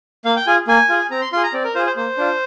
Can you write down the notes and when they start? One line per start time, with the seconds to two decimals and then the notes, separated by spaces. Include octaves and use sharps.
0.25 A#3 F5
0.36 G5
0.47 F4 G#4 G#5
0.68 A#3 G#5
0.89 F4 G#4
1.11 C4 A#5
1.21 C6
1.33 F4 G#4 C6
1.43 A#5
1.53 C4 D5
1.64 A#4
1.75 F4 G#4 C5
1.86 C5
1.96 A#3 C5
2.18 D4 F4